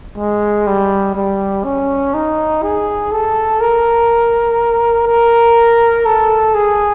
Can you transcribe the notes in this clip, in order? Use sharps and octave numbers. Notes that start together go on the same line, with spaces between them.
G#3
G3
G3
C#4
D#4
G#4
A4
A#4
A#4
A4
G#4